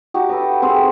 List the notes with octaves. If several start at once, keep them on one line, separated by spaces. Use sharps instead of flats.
D#4 F#4 G4
A4 B4 D#5
C4 G#4 A4 C5